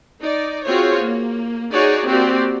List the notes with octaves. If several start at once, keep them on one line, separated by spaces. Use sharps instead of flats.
D#4 D5
C4 F4 F#4 G#4 C5 C#5
A#3
D#4 F#4 G#4 C#5 D5
A#3 C4 F#4 G4 D5